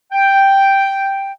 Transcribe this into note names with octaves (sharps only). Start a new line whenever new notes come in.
G5